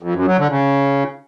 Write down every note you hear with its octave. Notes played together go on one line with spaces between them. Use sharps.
F2
F#2
F#3
D3
C#3